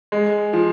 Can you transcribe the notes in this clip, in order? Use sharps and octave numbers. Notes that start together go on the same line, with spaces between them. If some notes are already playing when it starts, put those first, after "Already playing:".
G#3
F3